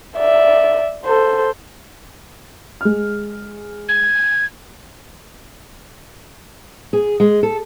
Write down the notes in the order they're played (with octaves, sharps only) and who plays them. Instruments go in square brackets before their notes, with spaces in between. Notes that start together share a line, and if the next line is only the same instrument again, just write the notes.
[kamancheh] D5 E5
A4 C5
[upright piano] G#3 F6
[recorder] G#6
[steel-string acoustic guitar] G#4
G#3
A4